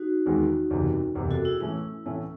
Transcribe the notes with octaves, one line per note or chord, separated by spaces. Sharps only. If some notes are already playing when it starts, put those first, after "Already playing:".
Already playing: D#4 F#4
E2 D#3 G#3
F#1 E2 C3
F#1 E2 C3
F#4 A4
E4 G#4
A2 E3 A3 C#4 E4
A2 E3 A3 C#4